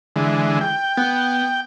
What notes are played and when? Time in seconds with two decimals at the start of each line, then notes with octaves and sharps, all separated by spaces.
0.16 D3 E3 G#3
0.61 G5
0.97 B3